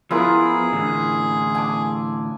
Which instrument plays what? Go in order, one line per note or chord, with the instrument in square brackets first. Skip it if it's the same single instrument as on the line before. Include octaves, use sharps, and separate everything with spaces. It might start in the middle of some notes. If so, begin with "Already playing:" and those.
[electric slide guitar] F3 B3 [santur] E4 F4 A#4 [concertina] G#4
[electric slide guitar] A2 D3 E3
[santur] G#5 A5 D6